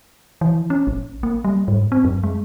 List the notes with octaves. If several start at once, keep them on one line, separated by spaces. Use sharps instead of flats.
E3
C#4
A1
A#3
G3
G#2
C4
F#2
G#3